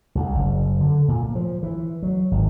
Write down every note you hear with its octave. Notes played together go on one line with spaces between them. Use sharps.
C2
F#1
D3
A#2
A#3
F3
E3
F#3
G#1